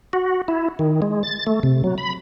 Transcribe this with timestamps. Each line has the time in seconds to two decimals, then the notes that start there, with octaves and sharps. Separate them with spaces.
0.13 F#4
0.48 E4
0.79 D#3
1.02 G#3
1.23 A6
1.47 A3
1.63 C3
1.84 F#3
1.98 B5